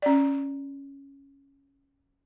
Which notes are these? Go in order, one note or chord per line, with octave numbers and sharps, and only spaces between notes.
C#4 D5